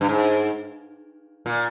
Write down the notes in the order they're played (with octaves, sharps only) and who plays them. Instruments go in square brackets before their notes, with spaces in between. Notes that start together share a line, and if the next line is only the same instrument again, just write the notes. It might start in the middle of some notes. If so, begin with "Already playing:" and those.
[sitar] G2
G#2
A#2